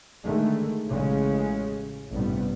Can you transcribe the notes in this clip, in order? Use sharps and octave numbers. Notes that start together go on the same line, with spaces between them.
D3 D#3 G#3 A3
A1 C#3 G#3 C#4
A1 G2 C3 G3 B3